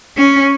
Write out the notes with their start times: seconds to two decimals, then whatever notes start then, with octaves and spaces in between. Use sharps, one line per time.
0.17 C#4